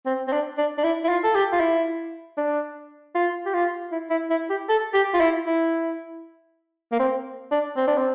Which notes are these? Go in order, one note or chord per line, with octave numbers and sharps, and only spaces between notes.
C4
C4
D4
D4
D4
E4
E4
F4
A4
G4
F4
E4
D4
F4
G4
F4
E4
E4
E4
G4
A4
G4
F4
E4
E4
A#3
C4
D4
C4
D4
C4